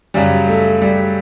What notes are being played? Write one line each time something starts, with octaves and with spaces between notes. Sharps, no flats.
F#2 C#3 F#3 G3
A3
G3